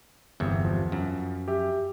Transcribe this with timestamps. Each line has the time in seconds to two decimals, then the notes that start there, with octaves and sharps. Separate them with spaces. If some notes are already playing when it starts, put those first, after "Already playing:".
0.40 G1 E2 C3
0.65 F3
0.92 F#2
1.48 G4 E5